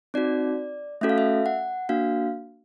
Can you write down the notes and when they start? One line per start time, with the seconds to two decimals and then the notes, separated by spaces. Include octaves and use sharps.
0.14 C4 D#4 F#4 D5
1.01 A3 C#4 F#4 A4 E5
1.09 F5
1.18 E5
1.46 F#5
1.89 A#3 D4 F#4 F5